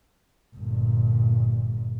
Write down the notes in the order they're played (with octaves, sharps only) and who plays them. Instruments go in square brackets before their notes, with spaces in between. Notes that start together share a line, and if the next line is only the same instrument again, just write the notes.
[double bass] G1 A#2